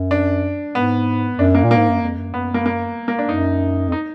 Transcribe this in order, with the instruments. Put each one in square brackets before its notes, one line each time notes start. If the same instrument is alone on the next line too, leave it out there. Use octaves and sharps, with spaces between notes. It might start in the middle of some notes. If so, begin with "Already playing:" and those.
Already playing: [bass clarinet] F#2
[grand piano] D4
[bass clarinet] G#2 [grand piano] B3
[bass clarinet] F#2 [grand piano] D4
[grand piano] A#3
[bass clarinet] A#2
[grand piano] A#3
[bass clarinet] G#2
F#2
F2
F#2
[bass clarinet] F#2 [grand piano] B3
[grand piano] A#3
A#3
A#3
D4
[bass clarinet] F#2 [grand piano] D#4
[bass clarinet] F2
[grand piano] D#4